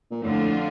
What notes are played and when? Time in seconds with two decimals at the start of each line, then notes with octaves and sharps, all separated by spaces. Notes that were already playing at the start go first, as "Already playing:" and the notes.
0.11 A#2
0.23 F2 A2 D3 A3 D4 F4